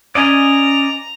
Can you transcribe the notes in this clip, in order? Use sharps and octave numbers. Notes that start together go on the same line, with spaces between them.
C#4 D5 D#5 G#5 A#5